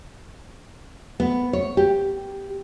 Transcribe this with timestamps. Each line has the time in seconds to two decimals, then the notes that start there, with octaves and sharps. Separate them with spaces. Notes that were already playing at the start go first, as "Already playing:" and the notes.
1.20 B3
1.53 C#5
1.77 G4